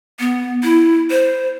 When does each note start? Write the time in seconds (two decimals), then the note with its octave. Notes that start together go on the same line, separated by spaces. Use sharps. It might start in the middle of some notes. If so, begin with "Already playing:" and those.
0.19 B3
0.63 E4
1.10 C5